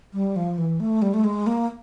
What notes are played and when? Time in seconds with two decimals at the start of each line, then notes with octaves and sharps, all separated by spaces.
0.14 G3
0.36 F3
0.58 E3
0.80 A3
1.02 G3
1.14 A3
1.24 G#3
1.47 A#3